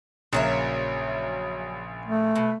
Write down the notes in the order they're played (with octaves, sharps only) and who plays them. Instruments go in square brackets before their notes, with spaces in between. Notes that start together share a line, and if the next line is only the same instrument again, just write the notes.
[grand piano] A#1 C#3 A#3 [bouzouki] F#3 C#5 E5
[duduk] A3
[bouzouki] B2